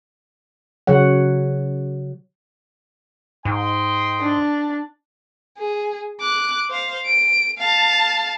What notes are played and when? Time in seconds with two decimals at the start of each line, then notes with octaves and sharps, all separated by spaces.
0.87 C#3 F#3 C#5 F#5
3.45 G#2 D#5 G5 C6
4.21 D4
5.58 G#4
6.20 D6 F#6
6.70 C5 F5
7.06 D7
7.58 F5 A5